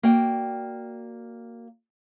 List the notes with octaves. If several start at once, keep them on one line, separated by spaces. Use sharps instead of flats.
A#3 F#4 D5 G5